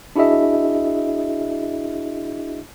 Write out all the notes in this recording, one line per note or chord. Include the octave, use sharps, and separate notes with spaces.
D4 E4 F#4 G#4 D#5 E5